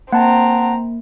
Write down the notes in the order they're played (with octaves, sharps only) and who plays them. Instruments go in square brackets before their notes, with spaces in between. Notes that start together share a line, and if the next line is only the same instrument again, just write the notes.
[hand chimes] A#3 [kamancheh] C4 A#5 [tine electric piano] F#5 A5